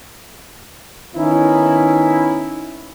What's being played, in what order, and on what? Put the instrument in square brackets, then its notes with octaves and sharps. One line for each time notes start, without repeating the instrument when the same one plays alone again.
[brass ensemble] D#3 B3 C#4 D#4 E4